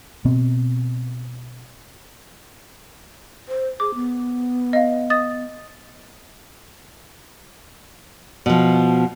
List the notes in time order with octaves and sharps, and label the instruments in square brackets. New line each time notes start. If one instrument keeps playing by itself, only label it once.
[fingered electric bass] B2 B3 C4
[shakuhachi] C5
[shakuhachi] G#4 [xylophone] D6
[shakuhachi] B3
[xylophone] D#5 F5
D#5 D#6 A6
[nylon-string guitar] B2 F3